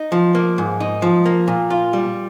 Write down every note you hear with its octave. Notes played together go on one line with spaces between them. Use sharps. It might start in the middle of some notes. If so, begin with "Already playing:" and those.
Already playing: D#4
F3
A#3
G#2
D#4
F3
A#3
A#2
F4
G3